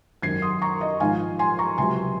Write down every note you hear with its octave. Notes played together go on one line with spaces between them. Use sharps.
G#1 F#2 D#3 G#6 C7
C6 D#6
A#5 C#6
D#5
G#1 G#2 F3 F5 G#5
G#5 C6
A#5 C#6
C#2 C3 F#3 G#5 C6